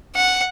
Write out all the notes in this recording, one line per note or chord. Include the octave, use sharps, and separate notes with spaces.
F#5